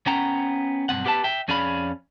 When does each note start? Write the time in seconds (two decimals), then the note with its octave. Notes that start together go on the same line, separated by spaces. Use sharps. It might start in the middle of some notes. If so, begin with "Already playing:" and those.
0.07 B3 C#4 F#5 G5 A#5
0.89 B1 G2 B2 C4 F#5
1.05 B3 G4 B4 F5 A5
1.24 E5 G5
1.48 F2 C#4 G#4 D5 F5 B5